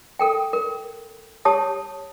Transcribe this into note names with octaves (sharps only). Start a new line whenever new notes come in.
A4 A#4 G5
A#4
G4 C#5 A5 D#6